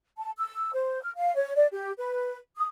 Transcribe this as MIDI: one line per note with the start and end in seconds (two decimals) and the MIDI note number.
0.18 0.30 81
0.38 0.70 88
0.74 1.01 72
1.02 1.11 89
1.16 1.34 77
1.35 1.53 73
1.55 1.67 74
1.72 1.91 67
1.98 2.36 71
2.56 2.66 87